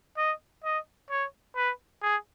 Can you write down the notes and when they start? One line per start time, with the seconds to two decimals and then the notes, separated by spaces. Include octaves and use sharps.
0.18 D#5
0.64 D#5
1.10 C#5
1.56 B4
2.02 G#4